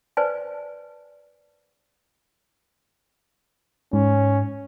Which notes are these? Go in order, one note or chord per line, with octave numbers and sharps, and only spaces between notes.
B4 C5 D5 G#5 A5
G#2 C#4